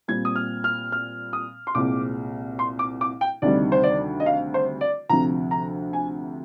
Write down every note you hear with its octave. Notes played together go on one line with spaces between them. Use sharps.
A#2 G3 C4 G#6
D#6
F6
F6
F6
D#6
C6
C2 A#2 G#3 C4 D6
C6
D6
D6
G5
D2 C3 D#3 G3 D5
C5
D5
D#5
F5
C5
D5
D2 C3 F3 A#5
A#5
G#5